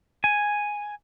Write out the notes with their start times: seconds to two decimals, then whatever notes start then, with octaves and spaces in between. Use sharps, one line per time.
0.24 G#5